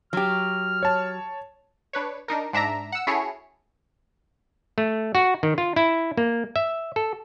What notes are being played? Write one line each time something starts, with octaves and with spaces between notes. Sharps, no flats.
F#3 G4 F6
C#5 A5
D4 B4 C#5
D4 D#4 A#4
G#2 D4 E5 A#5
F#5 E6
C#4 E4 F#4 G#4 A4 C#5
A3
F#4
D#3
F4
E4
A#3
E5
A4